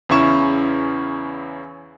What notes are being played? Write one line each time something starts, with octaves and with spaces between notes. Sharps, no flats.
E2 C#3 C#4 E4 C#6 E7